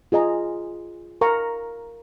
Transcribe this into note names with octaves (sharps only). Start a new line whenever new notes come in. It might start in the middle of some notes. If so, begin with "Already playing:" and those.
F4 G#4 D#5 A#5
A#4 F5 A#5 C#6